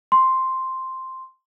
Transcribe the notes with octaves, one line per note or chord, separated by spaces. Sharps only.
C6